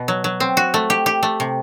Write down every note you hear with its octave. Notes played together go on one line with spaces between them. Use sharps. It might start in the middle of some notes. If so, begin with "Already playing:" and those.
Already playing: B2
F#3
F#3
C4
F#4
A3
G4
G4
A3
C3